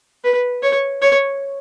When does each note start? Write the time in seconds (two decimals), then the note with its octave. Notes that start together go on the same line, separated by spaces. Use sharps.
0.24 B4
0.63 C#5
1.02 C#5